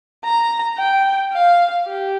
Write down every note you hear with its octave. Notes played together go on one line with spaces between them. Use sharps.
A#5
G5
F5
G4